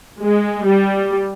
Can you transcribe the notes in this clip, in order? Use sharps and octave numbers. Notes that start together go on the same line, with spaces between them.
G#3
G3